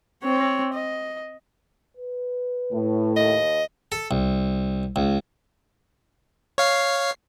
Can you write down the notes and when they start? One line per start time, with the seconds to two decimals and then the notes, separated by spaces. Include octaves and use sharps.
0.23 C4 C#5
0.73 D#5
1.97 B4
2.72 A2
3.16 D#2 D#5
3.92 A4
4.11 C2
4.96 C#2
6.58 C#5 F5 C7